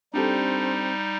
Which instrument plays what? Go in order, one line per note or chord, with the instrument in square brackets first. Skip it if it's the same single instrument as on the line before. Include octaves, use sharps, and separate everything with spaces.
[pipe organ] G3 D#4 [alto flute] C4 [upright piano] D4 G4 A4